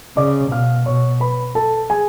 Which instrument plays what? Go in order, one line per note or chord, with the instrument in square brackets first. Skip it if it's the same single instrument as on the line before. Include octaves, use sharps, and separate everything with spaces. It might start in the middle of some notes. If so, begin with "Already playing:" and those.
[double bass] C#3 [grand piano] D5 D6
[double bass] B2 [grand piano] F5 F6
[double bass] B2 [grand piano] C#5 C#6
[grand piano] B4 B5
A4 A5
G#4 G#5